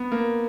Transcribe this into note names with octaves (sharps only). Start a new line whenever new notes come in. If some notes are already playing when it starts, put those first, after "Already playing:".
Already playing: B3
A#3